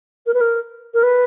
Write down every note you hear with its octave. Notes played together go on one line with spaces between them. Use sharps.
A#4
B4
A#4
A#4
B4